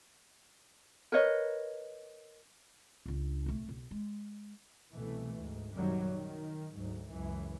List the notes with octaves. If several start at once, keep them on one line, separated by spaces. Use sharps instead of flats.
A#4 B4 C#5 D#5
C#2 D4
B1 A3
B1
G#3
C2 B2 E3 A3
D2 G#2
A#1 F#2 C3 D#3 F#3 G3
D#3
D2 G#2 F#3
C#2 F#2 E3